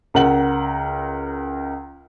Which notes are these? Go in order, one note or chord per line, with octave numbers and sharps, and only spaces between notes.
C#2 A#4 F#5 F#7